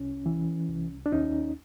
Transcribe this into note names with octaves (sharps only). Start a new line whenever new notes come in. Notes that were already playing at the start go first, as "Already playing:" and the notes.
Already playing: C2 C#4
E3
C2
D4
D#2 C#4 D#4